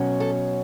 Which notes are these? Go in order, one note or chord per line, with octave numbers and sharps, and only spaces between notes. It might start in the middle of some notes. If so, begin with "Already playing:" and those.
Already playing: B2 F#3 C#4
A4